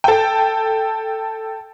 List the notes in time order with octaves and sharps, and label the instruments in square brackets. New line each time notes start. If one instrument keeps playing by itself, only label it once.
[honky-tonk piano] A4 G5